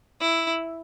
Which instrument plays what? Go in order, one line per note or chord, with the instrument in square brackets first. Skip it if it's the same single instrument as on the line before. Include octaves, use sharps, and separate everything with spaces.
[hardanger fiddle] E4